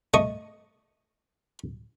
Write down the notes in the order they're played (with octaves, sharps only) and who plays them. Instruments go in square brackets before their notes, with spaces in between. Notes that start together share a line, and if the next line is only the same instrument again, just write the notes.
[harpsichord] A3 D#5 C#6